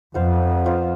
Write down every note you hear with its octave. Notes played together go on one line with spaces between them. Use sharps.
F2 B3 F4 C5 F5
B3 F4 C5 F5